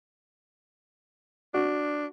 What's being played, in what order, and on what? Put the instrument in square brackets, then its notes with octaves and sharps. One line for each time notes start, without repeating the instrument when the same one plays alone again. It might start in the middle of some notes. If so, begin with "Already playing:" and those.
[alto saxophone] D4 [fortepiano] F#4